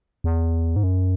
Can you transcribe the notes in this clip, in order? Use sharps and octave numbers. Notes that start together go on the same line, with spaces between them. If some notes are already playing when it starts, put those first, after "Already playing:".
E2
G#2
F#2